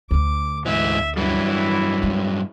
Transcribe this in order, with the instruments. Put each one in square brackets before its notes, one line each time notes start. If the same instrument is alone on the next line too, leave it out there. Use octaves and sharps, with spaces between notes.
[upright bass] D2 D3 [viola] D6
[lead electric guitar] G#2 E3 [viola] E5
[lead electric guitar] G2 F#3 [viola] E3 E4
[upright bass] G#3